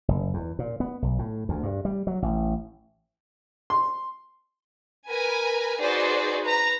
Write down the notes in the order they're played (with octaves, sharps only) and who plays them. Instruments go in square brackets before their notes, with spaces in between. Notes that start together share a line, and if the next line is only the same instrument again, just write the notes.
[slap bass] F#1
E2
A#2
B3
B1
A2
D2
G2
G3
F#3
A1
[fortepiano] C6
[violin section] A#4 B4 G#5
D#4 F#4 G#4 B4 C5 D5
B4 A#5